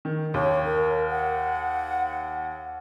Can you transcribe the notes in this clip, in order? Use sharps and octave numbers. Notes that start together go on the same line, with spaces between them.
D#3
D#2 C#5
A#4
F#5